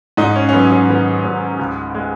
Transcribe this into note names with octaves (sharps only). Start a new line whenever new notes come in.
G#2 D#4
C#4
C#4
F#3 B3
C#4
D#3 B3
G#2
C#2
G#3